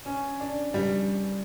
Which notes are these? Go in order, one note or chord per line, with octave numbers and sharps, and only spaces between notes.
C#4
D4
G3